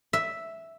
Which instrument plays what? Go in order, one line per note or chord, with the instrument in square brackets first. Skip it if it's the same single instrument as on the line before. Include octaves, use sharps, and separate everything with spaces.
[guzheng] E5